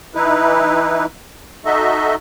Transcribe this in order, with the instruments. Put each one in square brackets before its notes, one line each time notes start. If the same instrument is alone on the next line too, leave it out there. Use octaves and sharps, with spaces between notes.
[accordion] E3 D#4 E4 B4
D#4 F#4 A4 D#5 E5